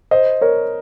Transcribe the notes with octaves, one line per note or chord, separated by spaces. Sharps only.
C5 D#5
A#4 C#5